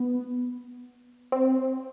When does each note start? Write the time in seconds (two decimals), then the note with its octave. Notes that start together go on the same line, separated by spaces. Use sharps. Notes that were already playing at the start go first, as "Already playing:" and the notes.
Already playing: B3
1.32 C4